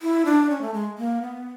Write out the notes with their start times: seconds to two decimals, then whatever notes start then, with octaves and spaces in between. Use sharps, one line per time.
0.02 E4
0.25 D4
0.50 C#4
0.61 A3
0.74 G#3
0.98 A#3
1.22 B3